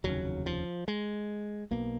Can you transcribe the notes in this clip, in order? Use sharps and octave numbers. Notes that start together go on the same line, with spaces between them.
F1 D#2 C#3 F#3
F3
G#3
B1 B2 A#3